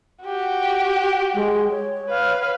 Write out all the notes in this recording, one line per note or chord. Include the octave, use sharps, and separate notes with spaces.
F#4 G4
G#3
C#5
B4 F5